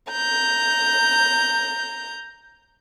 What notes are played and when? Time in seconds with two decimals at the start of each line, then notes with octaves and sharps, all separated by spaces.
0.11 A#5 G6